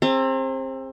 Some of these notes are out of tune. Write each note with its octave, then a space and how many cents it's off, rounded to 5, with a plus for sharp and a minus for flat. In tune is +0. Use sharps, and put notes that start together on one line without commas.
C4 +25 G#4 -30 A#5 -35